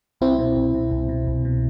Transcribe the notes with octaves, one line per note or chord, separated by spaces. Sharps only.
C2 C4 E4
B2
C2
B2
C2
B2
C2
B2